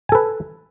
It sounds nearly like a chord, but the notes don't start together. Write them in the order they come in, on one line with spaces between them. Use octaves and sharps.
G#5 A4 B4